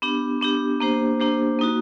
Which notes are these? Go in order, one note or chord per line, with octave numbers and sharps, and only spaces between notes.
B3 D4 G4
B3 D4 G4
A#3 D4 G4 C5
A#3 D4 G4 C5
A#3 D#4 F#4